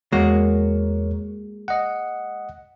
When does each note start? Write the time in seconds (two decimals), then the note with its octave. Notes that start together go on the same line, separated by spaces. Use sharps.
0.12 E2 G#3 A#3 F#4 A#4 C#5
1.68 D#5 F#5